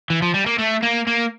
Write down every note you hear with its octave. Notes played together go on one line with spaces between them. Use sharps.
E3
F3
G3
A#3
A3
A#3
A#3